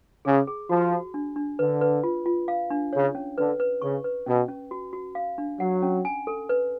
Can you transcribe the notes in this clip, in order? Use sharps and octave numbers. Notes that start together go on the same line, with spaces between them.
C#3 G#4
G#4
F3 F#4
F#4
D4
D4
D3 B4
B4
F4
F4
F5
D4
C#3 C#5
C#4
D3 B4
B4
C#3 C#6
B4
B2 C#4
C#4
F#4
F#4
F5
D4
F#3 F#5
C#4
G#5
A4
B4